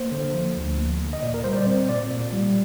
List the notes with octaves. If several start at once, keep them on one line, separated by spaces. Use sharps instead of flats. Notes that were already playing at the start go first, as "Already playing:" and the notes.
Already playing: A#3 C5
D3
F3
D2
A#3
D3
D#5
A#2 D5
A#4
G3 C5
D5
C4 C5
A#2 D5
A#2
G3